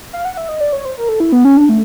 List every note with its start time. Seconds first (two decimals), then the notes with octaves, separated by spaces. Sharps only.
0.13 F5
0.25 F#5
0.37 E5
0.49 D#5
0.61 D5
0.73 C#5
0.85 C5
0.97 A#4
1.09 A4
1.20 E4
1.32 B3
1.45 C#4
1.57 D4
1.69 A3